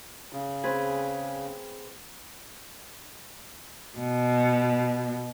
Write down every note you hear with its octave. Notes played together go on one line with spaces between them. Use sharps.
C#3
C4 G#4 B4
B2